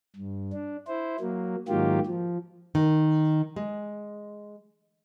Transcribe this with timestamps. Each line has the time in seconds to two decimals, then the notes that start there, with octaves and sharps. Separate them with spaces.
0.16 G2
0.53 D4
0.87 E4 C5
1.20 F#3 A#3
1.68 G#2 D#3 F#3 A#3 F4 G4
2.06 F3
2.75 D#3
3.56 G#3